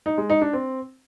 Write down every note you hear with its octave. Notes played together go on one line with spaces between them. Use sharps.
D#4
G#3
D#4
D4
C4